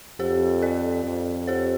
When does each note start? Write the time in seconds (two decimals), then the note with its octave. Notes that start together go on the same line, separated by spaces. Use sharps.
0.20 F2 G4 C5
0.62 A4 D5
1.05 F2
1.47 G4 C5